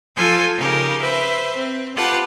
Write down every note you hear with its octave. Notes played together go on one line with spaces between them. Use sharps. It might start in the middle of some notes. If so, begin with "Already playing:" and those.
F3 F4 A4 G#5 E6 G6
C#3 D#4 G4 A#4
B4 C5 E5
C4
F4 G4 B4 F#5 A5